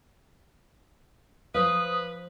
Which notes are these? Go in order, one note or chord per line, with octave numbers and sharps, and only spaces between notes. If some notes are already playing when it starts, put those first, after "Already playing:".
F3 B4 C5 F5 D#6